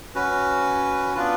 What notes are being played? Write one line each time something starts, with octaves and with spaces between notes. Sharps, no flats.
C#4 F#4 B4
B3 D4 F4 B4